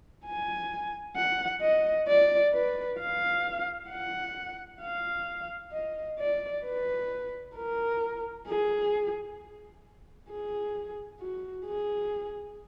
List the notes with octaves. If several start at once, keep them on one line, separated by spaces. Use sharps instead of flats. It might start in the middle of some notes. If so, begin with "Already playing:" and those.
G#5
F#5
D#5
D5
B4
F5
F#5
F5
D#5
D5
B4
A#4
G#4
G#4
F#4
G#4